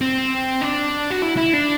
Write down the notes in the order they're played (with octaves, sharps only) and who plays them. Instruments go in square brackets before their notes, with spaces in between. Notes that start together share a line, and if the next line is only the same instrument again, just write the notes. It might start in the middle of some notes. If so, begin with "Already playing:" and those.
[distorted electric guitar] C4
D4
F#4
E4
E4
D4